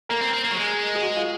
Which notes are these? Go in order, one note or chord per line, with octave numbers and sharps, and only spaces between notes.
A#3 A#4
C4
C4
A#3
F#3
G#3
G#4
F#4
F4